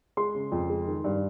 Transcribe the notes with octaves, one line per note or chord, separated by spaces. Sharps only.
G#3 C6
C#3
F2
G#3
D#3
G2